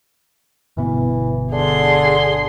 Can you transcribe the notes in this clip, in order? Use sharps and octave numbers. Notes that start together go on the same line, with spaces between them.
G1 B2 E3 B3
D3 D4 G#4 C6